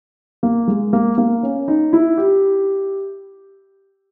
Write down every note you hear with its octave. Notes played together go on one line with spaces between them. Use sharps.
A#3
G#3
A#3
A#3
C#4
D#4
E4
G4